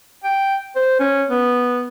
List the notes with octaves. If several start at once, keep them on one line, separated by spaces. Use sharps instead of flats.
G5
C5
C#4
B3